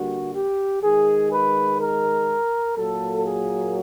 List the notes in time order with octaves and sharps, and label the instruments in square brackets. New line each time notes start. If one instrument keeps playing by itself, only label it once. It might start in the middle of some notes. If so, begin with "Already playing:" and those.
Already playing: [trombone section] D3 G3 A#3 F#4
G4
D#3 G#3 G#4
B4
A#4
A#2 F#3 A#3 A4
G#4